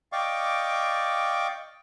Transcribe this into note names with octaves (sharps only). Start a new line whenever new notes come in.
D5 D#5 F5 G5 C#6 D6